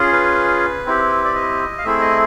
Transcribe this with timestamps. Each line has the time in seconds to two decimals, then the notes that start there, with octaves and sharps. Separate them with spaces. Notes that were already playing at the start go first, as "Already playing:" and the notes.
Already playing: C#4 F4 G#4
0.12 B4
0.86 C4 E4 G4
1.25 D5
1.35 D#5
1.78 F5
1.84 A3 C4 E4 G#4 E5
2.01 D#5